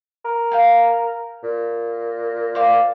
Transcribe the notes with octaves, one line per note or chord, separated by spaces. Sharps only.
A#4
F5 G5 G#5
A#2
C5 D5 F5